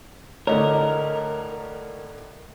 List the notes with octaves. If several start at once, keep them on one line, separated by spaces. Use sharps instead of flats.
A2 D3 A#4 C#5 D#5